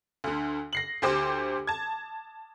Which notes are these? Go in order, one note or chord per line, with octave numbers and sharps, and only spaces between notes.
D2 D3
A#6 C7 F#7
D2 G4 C5 D6
A5 G#6